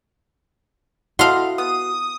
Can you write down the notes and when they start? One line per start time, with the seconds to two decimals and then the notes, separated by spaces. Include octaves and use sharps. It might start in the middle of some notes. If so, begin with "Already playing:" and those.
1.19 E4 F#4 A4 D#5 F5 F#5 C6
1.58 B3 D#6